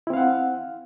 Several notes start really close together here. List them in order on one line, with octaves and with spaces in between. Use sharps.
E4 C4 F5 F#5